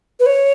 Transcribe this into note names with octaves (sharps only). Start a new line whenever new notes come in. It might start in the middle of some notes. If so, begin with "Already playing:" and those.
B4
C#5